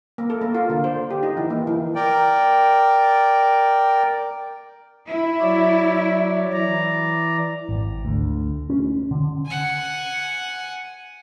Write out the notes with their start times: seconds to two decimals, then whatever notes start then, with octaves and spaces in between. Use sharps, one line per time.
0.18 A#3
0.30 A4
0.41 A#3
0.55 F4
0.70 D3
0.84 C5
1.11 G4
1.23 D#4
1.37 E3
1.50 A#3
1.67 E3
1.95 A#4 D5 G5
5.09 E4
5.40 F#3 C#5 D5
6.53 E3 D5 A#5
7.69 G#1
8.05 D2
8.70 C#4
9.11 D3
9.46 F#5 G#5